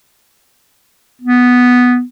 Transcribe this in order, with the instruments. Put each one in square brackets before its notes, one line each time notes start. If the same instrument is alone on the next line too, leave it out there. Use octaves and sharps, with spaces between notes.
[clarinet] B3